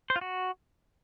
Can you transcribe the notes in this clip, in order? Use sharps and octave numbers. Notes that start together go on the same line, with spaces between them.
C5
F4
F#4